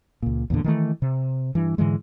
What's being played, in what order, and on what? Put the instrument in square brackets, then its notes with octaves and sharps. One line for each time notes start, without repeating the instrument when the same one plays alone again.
[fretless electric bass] C#2 A#2
E2 A#2 D3
D#3 E3 A3
C3
G2 E3
G#2 D3 E3 G#3